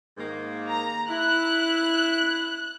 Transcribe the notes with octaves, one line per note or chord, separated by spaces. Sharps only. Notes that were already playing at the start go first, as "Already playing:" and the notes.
G#2 D#3 A#3
A#5
E4 F#6